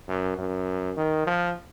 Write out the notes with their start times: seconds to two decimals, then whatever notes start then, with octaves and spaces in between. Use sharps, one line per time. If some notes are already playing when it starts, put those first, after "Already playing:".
0.08 F#2
0.38 F#2
0.97 D#3
1.27 F3